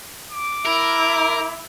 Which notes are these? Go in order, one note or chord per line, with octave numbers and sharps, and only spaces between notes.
D6
E4 A#4